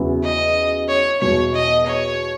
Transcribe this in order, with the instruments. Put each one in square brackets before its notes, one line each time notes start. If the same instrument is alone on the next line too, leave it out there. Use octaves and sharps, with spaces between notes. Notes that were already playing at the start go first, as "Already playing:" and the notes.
Already playing: [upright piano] E2 C#3 F#3 B3 E4
[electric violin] D#5
C#5
[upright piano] E2 B2 F#3 [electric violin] C#5
[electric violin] D#5
C#5